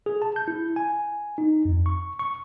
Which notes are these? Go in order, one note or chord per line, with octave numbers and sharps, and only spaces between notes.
G#4
A5
G6
E4
G#5
D#4
F2
C#6
C#6